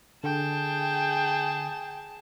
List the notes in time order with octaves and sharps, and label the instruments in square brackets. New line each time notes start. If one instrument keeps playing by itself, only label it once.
[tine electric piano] D3 [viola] G#4 A5 [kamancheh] G5